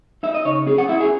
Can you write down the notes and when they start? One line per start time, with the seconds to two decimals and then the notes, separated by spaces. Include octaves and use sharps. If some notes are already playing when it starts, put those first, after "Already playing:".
0.23 D#4 E5
0.34 D#5
0.45 C#3 C#5
0.67 C#4 G#4
0.78 F#5
0.89 E4 E5
1.00 G#4